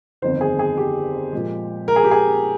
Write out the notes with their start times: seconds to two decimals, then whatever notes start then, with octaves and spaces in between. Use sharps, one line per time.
0.22 G1 F2 D#3 C5
0.41 G#4
0.59 G#4
0.77 G4
1.33 A#2 F3 G#3
1.88 A#4
1.96 G#4
2.04 G4
2.11 G#4